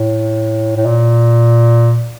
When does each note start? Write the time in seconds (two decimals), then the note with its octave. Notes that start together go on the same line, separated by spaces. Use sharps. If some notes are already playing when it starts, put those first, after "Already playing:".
Already playing: A2
0.76 A2
0.86 A#2